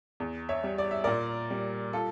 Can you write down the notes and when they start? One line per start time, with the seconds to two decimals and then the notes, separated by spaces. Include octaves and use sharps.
0.20 E2
0.49 C#5 E5
0.64 G3
0.78 D5
0.91 E5
1.04 A#2 A#4 D5
1.50 G3
1.93 F4 A4